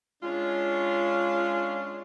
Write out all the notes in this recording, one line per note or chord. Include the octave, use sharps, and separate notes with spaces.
G#3 C#4 D4 F4